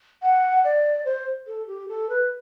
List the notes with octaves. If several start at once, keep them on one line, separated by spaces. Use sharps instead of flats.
F#5
D5
C5
A4
G4
A4
B4